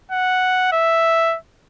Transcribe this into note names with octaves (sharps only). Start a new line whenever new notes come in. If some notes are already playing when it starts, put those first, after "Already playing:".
F#5
E5